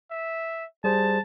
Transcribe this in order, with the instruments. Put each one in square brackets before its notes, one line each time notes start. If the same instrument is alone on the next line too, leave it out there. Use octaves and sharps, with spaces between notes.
[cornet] E5
[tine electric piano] G3 G#4 C5 [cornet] A5